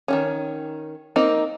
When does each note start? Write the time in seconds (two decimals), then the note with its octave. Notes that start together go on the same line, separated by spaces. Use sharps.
0.08 D#3 F3 C#4
1.16 A#3 C4 D#4